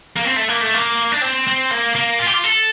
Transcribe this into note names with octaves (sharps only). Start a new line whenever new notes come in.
A#3
C4
A3
A#3
A3
A#3
D4
C4
C4
A#3
A#3
F4
G4
F4
A4